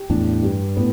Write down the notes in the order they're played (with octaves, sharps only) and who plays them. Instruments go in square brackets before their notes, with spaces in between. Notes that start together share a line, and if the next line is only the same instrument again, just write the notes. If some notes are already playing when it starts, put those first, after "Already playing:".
Already playing: [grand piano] G4
[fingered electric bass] E2 A2 [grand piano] D4
[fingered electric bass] G2 [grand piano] G4
[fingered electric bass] A2 [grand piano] B3